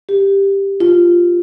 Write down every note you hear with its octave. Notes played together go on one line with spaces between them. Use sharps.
G4
F4